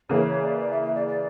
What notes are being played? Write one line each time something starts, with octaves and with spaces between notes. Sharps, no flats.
C#3 E3 A#3 C#5
C#5
D5
D5
E5
E5
D5
D5